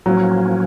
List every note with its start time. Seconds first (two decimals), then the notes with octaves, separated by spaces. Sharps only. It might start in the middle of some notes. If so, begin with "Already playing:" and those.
0.06 A2 F3 F#3 A#3 C#4